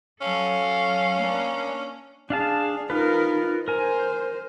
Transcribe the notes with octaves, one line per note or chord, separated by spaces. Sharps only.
F#3 C#4 A4 F5
A#3 D4
D4 G#4 F5 A5
D#4 F4 A#4 B4
A#4 C5 G#5